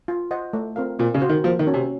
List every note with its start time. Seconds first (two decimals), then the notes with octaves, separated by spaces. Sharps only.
0.08 F4
0.31 C5 D#5 F#5
0.53 A3
0.76 C4 F4 A#4 F5
0.99 A#2 C4
1.15 C#3
1.22 F#4 C5 F5
1.29 D#3
1.44 F3 A#3
1.59 D#3
1.67 C#4 F#4
1.74 C3